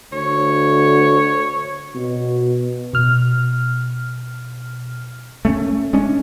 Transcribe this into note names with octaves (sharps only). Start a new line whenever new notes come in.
D2 C#5
B2
B2 F6
A3 C#4
G#3 C#4 D4